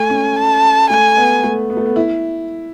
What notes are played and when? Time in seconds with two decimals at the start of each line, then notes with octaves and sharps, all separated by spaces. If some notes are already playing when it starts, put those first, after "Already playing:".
Already playing: A3 G#5
0.10 C#4
0.36 A5
0.90 A3 G#5
1.17 B3
1.44 A3
1.70 B3
1.77 A3
1.86 B3
1.96 E4